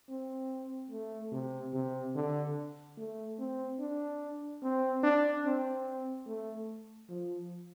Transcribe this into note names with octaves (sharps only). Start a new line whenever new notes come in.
C4
A3
C3
C3
D3
A3
C4
D4
C4
D4
C4
A3
F3